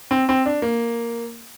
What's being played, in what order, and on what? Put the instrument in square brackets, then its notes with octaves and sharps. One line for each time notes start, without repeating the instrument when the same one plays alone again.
[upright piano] C4
C4
D4
A#3